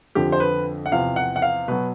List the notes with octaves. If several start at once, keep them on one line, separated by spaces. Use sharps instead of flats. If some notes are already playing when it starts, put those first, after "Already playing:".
F2 D3 F3 G4
C5
B4
F#5
E2 C3 F3 F5
F#5
F#5
F5
B2 F#3 B4